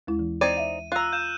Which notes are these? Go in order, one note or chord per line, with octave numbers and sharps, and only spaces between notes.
D#2 G#3 E4
E3
C4 D#4 D5 G#6 D#7
E5 F5
F4 A#5 E6 F#6
F5 G6 E7